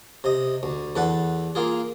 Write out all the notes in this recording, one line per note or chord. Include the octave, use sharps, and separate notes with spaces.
C3 D#5
D2
E2 A4 B4 F#5
A#3 F4 G#4